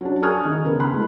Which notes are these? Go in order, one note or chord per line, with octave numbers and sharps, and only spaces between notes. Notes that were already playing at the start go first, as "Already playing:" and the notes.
F#3 C#4 D4
G#5 C#6 D#6 F6 F#6 G#6
D#3
C#3 B3 A#4
B5 C6 F#6
G#3 A3 E4